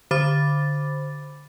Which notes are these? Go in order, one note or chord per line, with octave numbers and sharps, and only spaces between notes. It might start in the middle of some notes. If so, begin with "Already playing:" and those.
D3 C5 B5 D6 A6